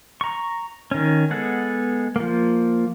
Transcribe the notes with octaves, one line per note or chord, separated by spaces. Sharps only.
A#5 C#6
D#3 C#4
G#3 B3 G#4 A4 F#5
F3 A#3